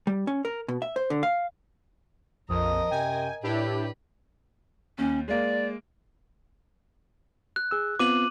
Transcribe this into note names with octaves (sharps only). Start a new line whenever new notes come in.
G3
C#4
A#4
B2
E5
C5
D3
F5
A#1 F2 F3 A#4 D#5 D#6
F#2 C3 G5 G#5
A2 D4 E4 G4 B4
D#2 C#4
G#3 A#3 D5
F#6
G#4 E6
B3 C4 F4 D6 D#7 F#7